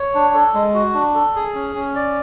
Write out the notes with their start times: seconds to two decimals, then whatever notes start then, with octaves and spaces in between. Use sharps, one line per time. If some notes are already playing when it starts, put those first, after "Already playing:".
Already playing: C#5
0.14 D4
0.34 A4
0.54 G#3
0.74 F#4
0.94 D4
1.15 A4
1.36 G#4
1.55 C#4
1.75 C#4
1.96 D5